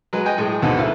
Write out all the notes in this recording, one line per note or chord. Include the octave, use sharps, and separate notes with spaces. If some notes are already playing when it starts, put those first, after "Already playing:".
F#3 G#3 B4
D#5 G5 G#5
A2 G#3 G#4
D2 G#2 B2 C4 D#4 A5
E4 A4 B4 F5